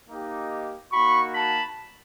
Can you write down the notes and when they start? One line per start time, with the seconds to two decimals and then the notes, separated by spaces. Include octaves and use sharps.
0.09 A#3 D#4 G4
0.92 A#3 D#4 F#4 B5 C#6
1.34 A5 B5